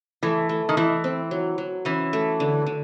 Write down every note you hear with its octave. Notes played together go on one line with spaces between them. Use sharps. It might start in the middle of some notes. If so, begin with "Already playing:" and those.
E3 A3
A3
D#3
E3 E4
C4
F#3
F#3
E3 C#4
A3
D3
D3